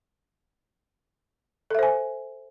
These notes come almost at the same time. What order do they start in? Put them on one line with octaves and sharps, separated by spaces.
A4 E5 C5 G#5